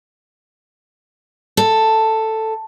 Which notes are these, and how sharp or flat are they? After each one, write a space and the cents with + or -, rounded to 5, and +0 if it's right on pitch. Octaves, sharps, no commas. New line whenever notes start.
A4 +5